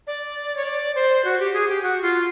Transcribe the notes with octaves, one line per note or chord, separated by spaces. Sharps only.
D5
C#5
D5
C5
F#4
G4
G#4
G4
F#4
F4